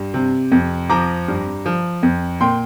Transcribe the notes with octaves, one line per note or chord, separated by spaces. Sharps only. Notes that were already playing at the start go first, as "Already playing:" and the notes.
Already playing: G2
C3
F2
F3 A#5 D6
G2
F3
F2
A#2 G5 C6